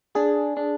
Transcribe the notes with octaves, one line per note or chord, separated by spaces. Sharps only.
D4 G#4
D4